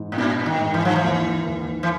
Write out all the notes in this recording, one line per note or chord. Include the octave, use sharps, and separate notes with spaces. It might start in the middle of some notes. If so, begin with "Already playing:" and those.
Already playing: G#2 E3
A2
A#2 D4
D#3
G#2
E3
F3
E3
D#2
D#2
E3